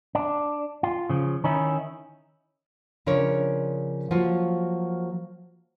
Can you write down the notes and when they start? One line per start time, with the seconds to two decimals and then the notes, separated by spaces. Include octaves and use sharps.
0.15 D4
0.83 F4
1.09 C#3 F3
1.44 D#3 C#4 D#4 E4
3.06 C#3 F3 D4 A#4 C#5
4.11 F3 F#3 A#3 F4